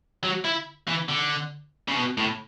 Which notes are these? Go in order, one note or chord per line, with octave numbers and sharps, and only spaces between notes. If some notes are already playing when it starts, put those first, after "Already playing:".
F#3
E4
E3
D3
C#3
B2
A2